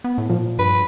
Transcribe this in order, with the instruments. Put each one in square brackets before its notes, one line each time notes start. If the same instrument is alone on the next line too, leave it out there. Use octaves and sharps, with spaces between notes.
[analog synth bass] B3
A2
[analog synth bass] A#2 [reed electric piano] F3
[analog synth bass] G2 [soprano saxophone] B4